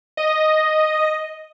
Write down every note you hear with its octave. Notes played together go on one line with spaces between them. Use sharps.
D#5